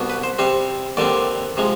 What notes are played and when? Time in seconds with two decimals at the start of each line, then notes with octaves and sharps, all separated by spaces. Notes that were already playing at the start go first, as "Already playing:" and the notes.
Already playing: C2 B2 B3 D4
0.10 B4
0.23 C5
0.39 C3 G3 C4 C5
0.97 D#2 D3 G3 C4 D5
1.57 C3 F3 G#3